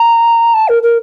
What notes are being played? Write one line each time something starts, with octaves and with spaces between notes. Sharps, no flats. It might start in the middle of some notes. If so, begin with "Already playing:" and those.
Already playing: A#5
A5
A#4
A#4